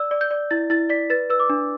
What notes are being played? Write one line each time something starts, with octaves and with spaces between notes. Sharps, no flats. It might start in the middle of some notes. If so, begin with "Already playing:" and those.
Already playing: D5 E6
D5
G6
D5
E4 A6
E4 A6
D5 B6
B4 A6
B4 E6
D6
D4